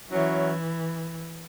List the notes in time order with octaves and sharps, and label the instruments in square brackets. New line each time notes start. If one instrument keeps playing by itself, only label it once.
[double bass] E3 [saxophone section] F#3 C#4 E4